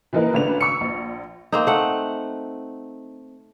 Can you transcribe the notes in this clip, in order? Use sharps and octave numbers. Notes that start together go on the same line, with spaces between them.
E3 F3 A#3 D#4 A#4 B4
G#1 C#3 A3 D4 B4 F7
C#6 E6 C#7
A#1
A#3 C4 D#4
A3 F#5